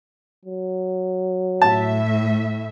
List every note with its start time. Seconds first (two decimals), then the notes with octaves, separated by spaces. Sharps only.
0.45 F#3
1.62 A2 E5 A5